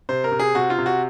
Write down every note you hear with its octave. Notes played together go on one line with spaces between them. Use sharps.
C3 C5
A#4
C3
G#4
C3 F#4
F4
C3
F#4